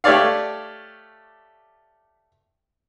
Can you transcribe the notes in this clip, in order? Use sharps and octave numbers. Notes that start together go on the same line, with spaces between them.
A3 G4 C#5 D5 F5